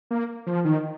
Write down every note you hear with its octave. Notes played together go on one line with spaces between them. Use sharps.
A#3
F3
D#3